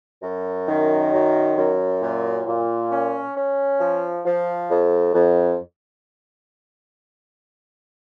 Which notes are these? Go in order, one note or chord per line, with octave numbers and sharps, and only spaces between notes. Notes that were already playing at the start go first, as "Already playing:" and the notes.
F#2
D#3
F#2
F#2
A#2
A#2
C#4
C#4
F3
F3
F2
F2